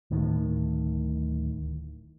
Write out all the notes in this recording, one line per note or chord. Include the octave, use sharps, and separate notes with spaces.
D1 A2 D#3